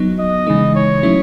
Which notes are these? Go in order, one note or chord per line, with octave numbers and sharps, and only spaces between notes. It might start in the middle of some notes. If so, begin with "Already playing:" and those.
Already playing: F#3 B3 D#4
D#5
C#3 E3 G#3 D#4
C#5
F#3 A3 C#4 E4